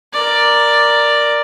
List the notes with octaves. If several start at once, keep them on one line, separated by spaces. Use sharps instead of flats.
A#4 D5